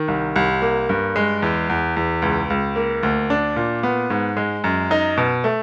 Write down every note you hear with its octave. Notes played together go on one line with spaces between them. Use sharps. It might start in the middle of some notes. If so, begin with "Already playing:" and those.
Already playing: D#3
C2
C2
A#3
G2
G#3
E2
E2
E2
C#2
C#2
A#3
D2
D4
A#2
B3
G#2
G#3
F#2
D#4
B2
A3